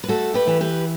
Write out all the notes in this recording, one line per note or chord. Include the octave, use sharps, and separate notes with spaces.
B4
A3 F#4 A4
G4 B4
E3
G4 B4